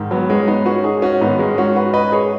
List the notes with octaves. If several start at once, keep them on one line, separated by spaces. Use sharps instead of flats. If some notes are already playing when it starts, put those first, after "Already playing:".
Already playing: G#2 D#3
F#3 B3
G#3 C#4
B3 D#4
C#4 F#4
D#4 G#4
C#4 F#4
G#2 D#3 B3 D#4
G#3 C#4
C#4 F#4
F#4 B4
B4 D#5
G#4 C#5